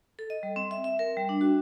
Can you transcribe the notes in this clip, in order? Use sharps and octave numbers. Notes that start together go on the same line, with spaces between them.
A4
D#5
G3
C4
E5
E5
A#4
G3
D4
F#4